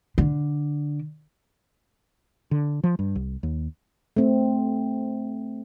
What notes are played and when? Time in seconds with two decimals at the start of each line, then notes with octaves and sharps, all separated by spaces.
0.18 D3
2.51 D3
2.84 F3
2.99 G2
3.15 C2
3.43 D#2
4.17 A3 C4